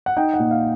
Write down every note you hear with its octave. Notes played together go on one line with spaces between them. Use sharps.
F#5
D#4 G5
F#5
A#2
F5